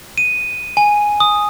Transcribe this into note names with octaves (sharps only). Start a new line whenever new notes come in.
D#7
G#5
D#6